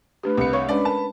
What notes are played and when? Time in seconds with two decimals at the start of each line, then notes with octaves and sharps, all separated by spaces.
0.23 A3 D4 G4 B4
0.38 C2 C#7
0.53 C#5 F5 C#6
0.68 G#3 C#4 D4 B4 D5
0.85 A#4 A5